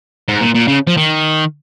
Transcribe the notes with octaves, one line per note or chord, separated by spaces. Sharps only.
G#2
A#2
A#2
C#3
F3
D#3